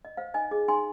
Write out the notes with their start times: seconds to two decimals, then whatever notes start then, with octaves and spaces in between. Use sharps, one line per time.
0.05 D#5
0.17 C5 F5
0.34 D#4 D#5 G#5
0.51 G#4 D#5
0.68 D#4 G#5 C6